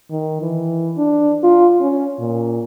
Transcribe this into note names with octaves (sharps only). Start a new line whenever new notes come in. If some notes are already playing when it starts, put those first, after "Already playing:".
D#3
E3
D4
F4
C#4
A#2